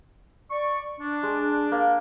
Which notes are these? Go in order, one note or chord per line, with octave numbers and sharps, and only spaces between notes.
D5 C#6
D4
G#3
A#3